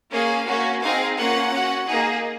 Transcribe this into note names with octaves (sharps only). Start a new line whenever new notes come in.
A#3 C#4 G#4 F5
A#3 C#4 F#4
C4 D#4 G#4 F5
A#3 C#4 F4 F#5
C#4 F#4
A#3 D#4 G#4